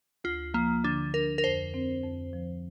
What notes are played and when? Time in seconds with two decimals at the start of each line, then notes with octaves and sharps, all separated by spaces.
0.24 D2 F4
0.54 F3 A#3
0.84 D3 D4
1.14 D4 A#4
1.38 A#4
1.44 F2 C5
1.74 C4
2.03 F2
2.33 F3